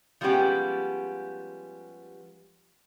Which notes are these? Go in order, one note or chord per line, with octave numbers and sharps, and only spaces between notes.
F3 G3 G#3 B3 C#4 G4